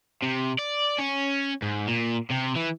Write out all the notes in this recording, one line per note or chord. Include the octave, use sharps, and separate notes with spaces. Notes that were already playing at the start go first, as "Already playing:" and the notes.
C3
D5
C#4
G#2
A#2
C3
E3